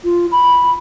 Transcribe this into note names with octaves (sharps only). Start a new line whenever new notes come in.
F4
B5